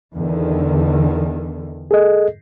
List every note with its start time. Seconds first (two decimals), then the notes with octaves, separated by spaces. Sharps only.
0.13 E2 D3 D#3
1.91 G#4 A4 D#5